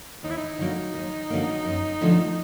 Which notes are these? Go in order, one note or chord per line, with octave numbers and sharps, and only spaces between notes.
D#2 D#4
E4
D#4
D3 F#3 A#3
D#2
D3 F#3 A#3
F#2
D3 F3 A3 D4